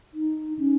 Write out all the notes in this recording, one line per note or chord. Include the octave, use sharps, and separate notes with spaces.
D#4
C#4